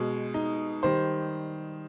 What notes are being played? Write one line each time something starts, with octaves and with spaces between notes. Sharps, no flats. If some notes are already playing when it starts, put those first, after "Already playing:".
Already playing: B2 G#3
D#4
D#3 G3 C5